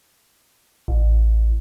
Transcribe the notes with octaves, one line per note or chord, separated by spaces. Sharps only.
A1